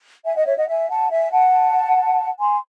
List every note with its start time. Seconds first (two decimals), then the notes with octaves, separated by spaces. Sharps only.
0.25 E5 G#5
0.35 D#5 F#5
0.46 C#5 E5
0.57 D#5 F#5
0.68 E5 G#5
0.89 F#5 A5
1.11 E5 G#5
1.32 F#5 A5
2.39 G#5 C6